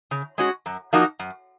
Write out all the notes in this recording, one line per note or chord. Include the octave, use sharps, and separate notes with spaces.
C#3
G#3 C#4 F#4
F#2
F3 A#3 D#4 F#4
F#2